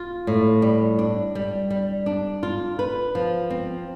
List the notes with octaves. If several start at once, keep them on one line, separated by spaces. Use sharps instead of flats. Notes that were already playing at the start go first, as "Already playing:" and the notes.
Already playing: F4
A2
G3
D4
G3
G3
D4
F4
B4
F3
C4